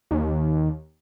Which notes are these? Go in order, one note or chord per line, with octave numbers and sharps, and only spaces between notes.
D#2